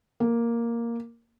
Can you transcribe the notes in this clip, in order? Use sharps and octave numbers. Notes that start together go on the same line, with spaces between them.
A#3